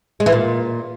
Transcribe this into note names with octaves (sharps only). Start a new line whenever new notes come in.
G#3
E3
A#2